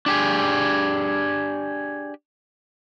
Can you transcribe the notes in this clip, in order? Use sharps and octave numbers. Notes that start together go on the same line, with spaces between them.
D4 G4 G#4